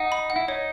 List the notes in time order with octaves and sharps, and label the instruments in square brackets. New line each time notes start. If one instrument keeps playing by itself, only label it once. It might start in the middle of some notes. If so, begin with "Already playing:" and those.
Already playing: [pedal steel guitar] D#4 [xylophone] F#5
[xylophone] B5
F#5
[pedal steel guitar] E4
[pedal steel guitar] D#4 [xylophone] C#5